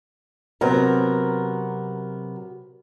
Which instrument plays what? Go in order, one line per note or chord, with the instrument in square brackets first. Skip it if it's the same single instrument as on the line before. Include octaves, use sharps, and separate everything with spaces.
[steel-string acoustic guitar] C3 F#3 B3 A#4